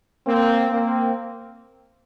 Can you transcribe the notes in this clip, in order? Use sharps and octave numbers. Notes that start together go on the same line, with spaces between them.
A#3 C4
A#3 C4